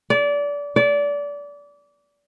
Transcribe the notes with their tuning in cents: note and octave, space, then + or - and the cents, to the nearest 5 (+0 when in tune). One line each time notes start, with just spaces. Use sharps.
D5 -25
D5 -25